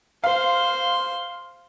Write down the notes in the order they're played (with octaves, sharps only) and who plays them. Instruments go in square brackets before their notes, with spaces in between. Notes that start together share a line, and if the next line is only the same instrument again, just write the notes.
[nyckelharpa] C5 C6 [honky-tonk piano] F5